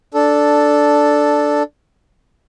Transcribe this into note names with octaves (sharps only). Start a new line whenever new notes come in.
D4 A4